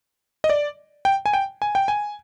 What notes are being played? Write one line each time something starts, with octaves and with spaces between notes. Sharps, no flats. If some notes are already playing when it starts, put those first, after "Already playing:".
D#5
D5
G5
G#5
G5
G#5
G5
G#5